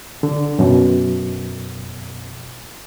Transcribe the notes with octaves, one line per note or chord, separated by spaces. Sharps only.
D3
F#2 B2